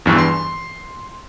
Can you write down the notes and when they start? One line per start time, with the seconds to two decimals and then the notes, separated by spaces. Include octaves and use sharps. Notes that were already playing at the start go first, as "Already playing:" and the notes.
0.06 E2 G2 E3
0.18 C6